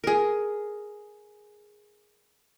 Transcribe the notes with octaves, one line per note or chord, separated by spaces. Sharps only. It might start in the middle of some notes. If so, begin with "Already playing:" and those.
G#4 A#4